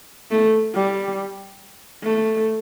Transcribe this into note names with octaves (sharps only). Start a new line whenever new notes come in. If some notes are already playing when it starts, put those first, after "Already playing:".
A3
G3
A3